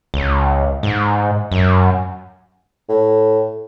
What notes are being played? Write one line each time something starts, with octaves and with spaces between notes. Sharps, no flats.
C#2
G#2
F#2
A2